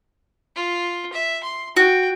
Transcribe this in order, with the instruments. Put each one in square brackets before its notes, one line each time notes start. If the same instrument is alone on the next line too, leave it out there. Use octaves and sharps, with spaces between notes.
[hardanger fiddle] F4
E5
C6
[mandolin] F#4 [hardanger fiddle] G5